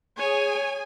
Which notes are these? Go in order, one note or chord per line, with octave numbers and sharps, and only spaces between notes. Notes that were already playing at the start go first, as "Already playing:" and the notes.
G#4 C#5 G#5